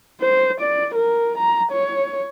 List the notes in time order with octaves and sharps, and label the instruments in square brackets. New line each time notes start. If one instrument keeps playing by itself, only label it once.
[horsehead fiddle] C5
D5
A#4
A#5
C#5